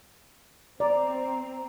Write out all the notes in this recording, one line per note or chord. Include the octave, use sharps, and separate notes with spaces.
C4 D5 A#5